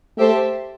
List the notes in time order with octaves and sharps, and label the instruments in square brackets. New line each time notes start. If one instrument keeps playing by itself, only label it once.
[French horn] A3 [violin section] G4 C5 E5 A5